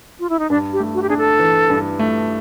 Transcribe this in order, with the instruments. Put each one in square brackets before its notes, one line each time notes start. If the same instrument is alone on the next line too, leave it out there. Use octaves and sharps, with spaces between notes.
[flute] F4
E4
D#4
[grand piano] G2 [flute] D4
[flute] G4
[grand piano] A3
[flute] F#4
G4
[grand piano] D4 [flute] G#4
[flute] A4
[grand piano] E3
G2
A3